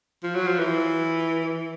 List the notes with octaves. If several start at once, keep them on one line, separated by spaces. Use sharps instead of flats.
F3
F#3
F3
E3